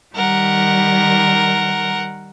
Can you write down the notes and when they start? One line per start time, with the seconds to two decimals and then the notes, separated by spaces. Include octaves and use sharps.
0.15 D#3 G3 A#4 F#5